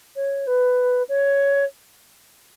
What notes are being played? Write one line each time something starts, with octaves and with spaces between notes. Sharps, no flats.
C#5
B4
C#5